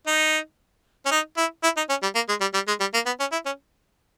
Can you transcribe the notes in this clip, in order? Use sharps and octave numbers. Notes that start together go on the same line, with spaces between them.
D#4
C#4
D#4
E4
E4
D#4
C#4
G3
A#3
G#3
G3
G3
G#3
G3
A#3
B3
C#4
E4
C#4